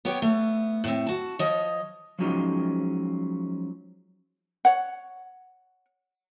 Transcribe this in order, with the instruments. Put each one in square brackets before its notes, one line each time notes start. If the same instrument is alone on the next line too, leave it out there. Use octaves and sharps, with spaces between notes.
[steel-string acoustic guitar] B3 G4 C#5 G5
A3 B3
A2 C4
F#4 A5
F3 C#5 D#5
[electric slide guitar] F3 F#3 G#3 C#4 D#4 F4
[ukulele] C#5 F#5